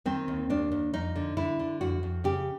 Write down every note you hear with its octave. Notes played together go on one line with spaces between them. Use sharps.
D#3 C4
D#2
D#2 D4
D#2
F2 D#4
D3
D3 E4
D3
F2 F#4
F2
C#3 G4